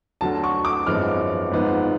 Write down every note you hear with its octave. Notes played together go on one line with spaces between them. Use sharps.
D2 D3 F#3 A5
C#6
D6
G#1 F#2 F3 G#3 B3 F6
G#1 G#2 F3 B3